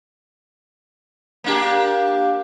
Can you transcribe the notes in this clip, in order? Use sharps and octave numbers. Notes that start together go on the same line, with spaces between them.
A#3 D4 G4